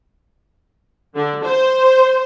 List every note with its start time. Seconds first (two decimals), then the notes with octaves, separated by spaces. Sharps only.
1.15 D3
1.45 C5